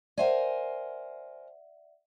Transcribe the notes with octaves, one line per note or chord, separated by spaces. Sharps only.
A#4 C5 D5 E5 F#5 G#5